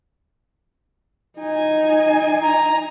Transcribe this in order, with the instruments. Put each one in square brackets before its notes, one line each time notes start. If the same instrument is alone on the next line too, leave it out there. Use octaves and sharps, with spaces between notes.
[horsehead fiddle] D#4 G#5
[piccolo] A#5